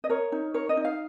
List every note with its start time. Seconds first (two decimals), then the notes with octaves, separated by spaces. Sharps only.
0.04 D#5
0.10 A#4 C#5
0.32 D#4
0.54 A#4 C#5
0.69 D#5
0.77 D#4
0.84 F5